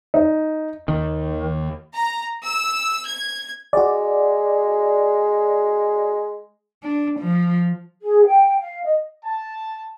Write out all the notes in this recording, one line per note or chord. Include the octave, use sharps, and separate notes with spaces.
D#4
D#2 D#3
A#5
E6
G#6
G#3 F#4 D5
D4
F3
G#4
G5
F5
D#5
A5